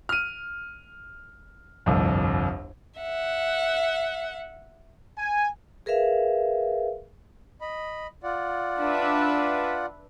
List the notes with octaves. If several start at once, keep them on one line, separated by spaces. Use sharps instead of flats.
F6 D#7
G1 C2 F2
E5 F#5
G#5
G#4 A#4 B4 E5 F5
D#5 B5
F4 D5 F#5
D4 B4 E5